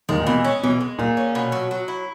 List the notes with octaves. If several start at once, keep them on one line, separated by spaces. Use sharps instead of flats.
D#2 D#3 G#3
A#2
B2 E3
C#4
B2 E3
G#3
A#2 G#4
C#4
B2
F#3
F#3
E4